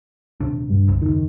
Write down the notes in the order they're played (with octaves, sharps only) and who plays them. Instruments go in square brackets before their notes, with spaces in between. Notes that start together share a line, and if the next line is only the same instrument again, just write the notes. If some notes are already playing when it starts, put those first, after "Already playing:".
[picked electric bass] D#1 C3 D4
[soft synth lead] G2
[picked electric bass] G1 C2
[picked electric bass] F#1 D#2 [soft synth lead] D#3